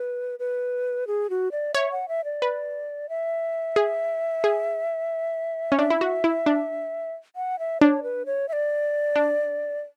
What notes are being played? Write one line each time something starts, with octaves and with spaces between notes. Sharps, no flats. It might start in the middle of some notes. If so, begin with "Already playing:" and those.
Already playing: B4
B4
G#4
F#4
D5
C#5 E5
F#5
E5
D5
B4
E5
G#4
G#4
C#4
D4 E5
E4
F#4
E4
D4
F#5
E5
D4 C#5
B4
C#5
E5
D5
D4